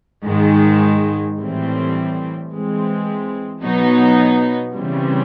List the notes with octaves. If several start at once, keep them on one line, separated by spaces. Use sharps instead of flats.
G#2 D#3 G#3
A2 E3 G3 C4
E3 G#3 C4
B2 F#3 B3 D#4
C#3 E3 G3 C4